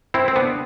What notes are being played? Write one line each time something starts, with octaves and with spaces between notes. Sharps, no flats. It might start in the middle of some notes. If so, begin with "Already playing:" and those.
C4 E4
C4
B3 D4